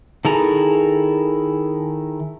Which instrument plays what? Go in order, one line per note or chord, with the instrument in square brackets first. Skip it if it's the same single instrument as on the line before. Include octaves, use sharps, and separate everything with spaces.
[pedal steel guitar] D#3 E4 G#4 A4 A#5